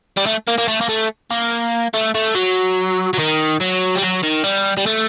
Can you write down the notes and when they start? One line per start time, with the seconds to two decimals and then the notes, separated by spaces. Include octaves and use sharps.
0.17 G3
0.26 A3
0.47 A#3
0.58 A#3
0.68 A3
0.81 A#3
0.89 A3
1.31 A#3
1.94 A3
2.15 A3
2.35 F#3
3.14 F#3
3.19 D#3
3.61 F#3
3.96 G3
4.02 F#3
4.23 D#3
4.44 G3
4.77 G3
4.86 A3